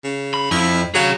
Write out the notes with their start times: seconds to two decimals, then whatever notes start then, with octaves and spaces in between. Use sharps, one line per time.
0.04 C#3
0.34 B5
0.51 F2 E4
0.95 F#3 G#4 F5